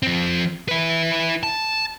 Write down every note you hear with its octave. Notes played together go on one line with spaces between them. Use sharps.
F3 C4
E4 B4
A5